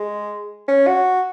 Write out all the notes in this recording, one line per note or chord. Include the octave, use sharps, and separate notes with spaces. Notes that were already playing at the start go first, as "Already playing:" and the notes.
Already playing: G#3
C#4
F#4